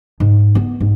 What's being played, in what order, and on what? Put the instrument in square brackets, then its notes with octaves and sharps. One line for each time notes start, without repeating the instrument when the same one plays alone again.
[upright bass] G#2
B3
G#2